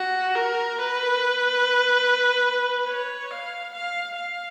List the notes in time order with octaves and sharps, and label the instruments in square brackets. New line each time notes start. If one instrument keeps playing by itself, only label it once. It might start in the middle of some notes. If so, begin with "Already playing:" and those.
Already playing: [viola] F#4
A#4
B4
C#5
F5
F5
F5